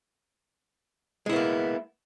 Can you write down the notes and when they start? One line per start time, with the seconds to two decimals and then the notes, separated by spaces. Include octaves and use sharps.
1.26 G#3
1.29 E4
1.33 B3
1.36 A#3